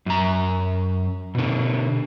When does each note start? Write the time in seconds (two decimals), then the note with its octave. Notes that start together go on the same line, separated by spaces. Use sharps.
0.06 F#2 A#5
1.35 B2 D3